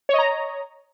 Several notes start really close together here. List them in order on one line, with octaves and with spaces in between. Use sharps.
C#5 D#5 A#5